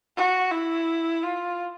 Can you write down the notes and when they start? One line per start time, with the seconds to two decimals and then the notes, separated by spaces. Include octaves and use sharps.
0.17 F#4
0.52 E4
1.24 F4